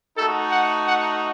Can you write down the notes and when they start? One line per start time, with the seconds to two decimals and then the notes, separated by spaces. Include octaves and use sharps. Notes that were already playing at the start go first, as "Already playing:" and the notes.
0.17 A3 D#4 F#4 A4
0.51 F#5
0.85 F#5